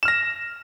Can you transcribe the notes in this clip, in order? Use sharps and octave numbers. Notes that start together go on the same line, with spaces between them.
F6 A#6 E7